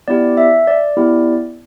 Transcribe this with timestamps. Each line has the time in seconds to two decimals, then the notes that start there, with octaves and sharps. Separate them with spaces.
0.08 B3 E4 G4 D5
0.37 E5
0.67 D5
0.97 B3 E4 G4